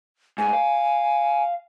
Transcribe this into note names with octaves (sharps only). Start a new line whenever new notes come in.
G#2 G#5
F5